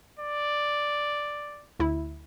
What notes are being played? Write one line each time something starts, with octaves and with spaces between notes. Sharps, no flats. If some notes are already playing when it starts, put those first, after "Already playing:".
D5
D2 E4